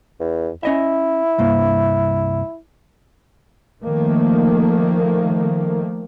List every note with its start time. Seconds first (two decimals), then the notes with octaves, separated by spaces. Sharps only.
0.20 E2
0.63 C#4 E4 D#5 E5
1.38 C2 G2 A#3
3.83 D#3 F3 A3 A#3